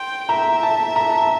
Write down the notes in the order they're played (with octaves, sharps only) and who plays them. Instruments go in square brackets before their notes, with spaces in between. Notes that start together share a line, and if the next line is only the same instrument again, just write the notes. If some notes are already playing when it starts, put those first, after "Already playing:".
Already playing: [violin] G5 [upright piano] C6
[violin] E5 [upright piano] A#5
[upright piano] A5
A#5
A5
A#5